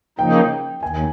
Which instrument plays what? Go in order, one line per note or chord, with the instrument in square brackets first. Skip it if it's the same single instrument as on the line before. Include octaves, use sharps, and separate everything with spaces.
[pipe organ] C#3 F3 A#3 D#4 [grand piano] G5
[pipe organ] D#2 [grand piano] G#5